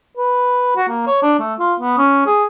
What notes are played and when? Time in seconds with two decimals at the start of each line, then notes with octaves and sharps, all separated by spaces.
0.17 B4
0.76 F#4
0.89 A#3
1.07 C#5
1.22 D4
1.39 A3
1.59 F4
1.80 B3
1.98 C#4
2.26 G#4